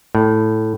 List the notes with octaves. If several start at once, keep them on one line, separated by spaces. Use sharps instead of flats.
A2